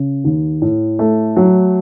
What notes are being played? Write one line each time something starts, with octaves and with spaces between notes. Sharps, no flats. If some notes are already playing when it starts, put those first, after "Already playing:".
Already playing: C#3
D#2
A2
A3
F#3